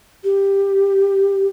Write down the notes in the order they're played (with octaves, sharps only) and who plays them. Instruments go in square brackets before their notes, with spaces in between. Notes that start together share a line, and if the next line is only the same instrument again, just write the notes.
[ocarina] G4